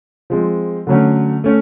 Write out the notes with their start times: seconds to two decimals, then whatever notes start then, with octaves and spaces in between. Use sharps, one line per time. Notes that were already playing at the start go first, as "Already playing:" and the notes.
0.30 F3 G#3 C4
0.87 D3 F#3 A3 C#4
1.44 A3 C#4